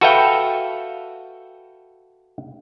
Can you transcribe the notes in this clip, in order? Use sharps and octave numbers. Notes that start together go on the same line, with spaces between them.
F#4 A4 B4 E5 F5 G5